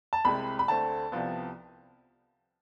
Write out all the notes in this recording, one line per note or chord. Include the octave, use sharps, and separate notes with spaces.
A5
C2 C3 G#3 B5
B5
D2 D3 A3 C4 A5
C2 C3 F3 B3